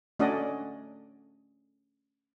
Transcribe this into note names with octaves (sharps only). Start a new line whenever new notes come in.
A3 C#4 D4 F#4 D5 D#5